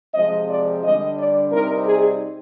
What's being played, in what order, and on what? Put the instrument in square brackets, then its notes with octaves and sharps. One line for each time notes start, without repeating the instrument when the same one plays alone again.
[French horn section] C3 F3 G#3 C4 D#5
D5
D3 G3 D4 D#5
D5
C3 G3 C4 D#4 A#4
G#4